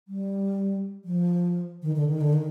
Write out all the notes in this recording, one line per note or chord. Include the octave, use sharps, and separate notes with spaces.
G3
F3
D#3
D3
D#3
D3
D#3